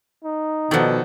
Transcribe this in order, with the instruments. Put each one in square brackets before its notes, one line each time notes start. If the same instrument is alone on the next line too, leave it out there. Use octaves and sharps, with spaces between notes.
[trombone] D#4
[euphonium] B2 [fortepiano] D#3 A4 F#5 [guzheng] F3 D5